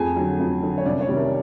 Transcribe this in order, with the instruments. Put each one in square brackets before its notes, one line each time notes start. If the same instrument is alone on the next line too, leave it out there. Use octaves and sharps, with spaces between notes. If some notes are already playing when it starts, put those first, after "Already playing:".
Already playing: [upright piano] F2 G#4 G#5
D3 F#3
F2
D3 F#3
C#5
C2 D4 D5
C#4 C#5
C3 D#3 G3
A#4